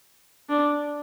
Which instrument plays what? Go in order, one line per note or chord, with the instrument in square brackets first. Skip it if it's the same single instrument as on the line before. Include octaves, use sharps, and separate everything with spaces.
[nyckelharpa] D4